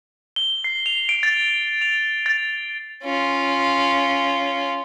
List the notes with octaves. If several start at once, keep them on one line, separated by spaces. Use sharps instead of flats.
G7
C7
F7
D7
A6
F7
A6
C#4 F4